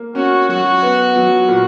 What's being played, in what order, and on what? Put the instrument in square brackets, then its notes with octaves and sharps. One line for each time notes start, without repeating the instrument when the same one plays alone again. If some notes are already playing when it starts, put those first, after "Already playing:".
Already playing: [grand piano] A#3
[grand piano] C#4 [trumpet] F#4
[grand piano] F#3 [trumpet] F#4
[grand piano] B3
F#3
A#2